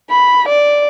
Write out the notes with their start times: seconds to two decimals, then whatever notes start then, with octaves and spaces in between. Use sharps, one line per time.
0.11 B5
0.49 D5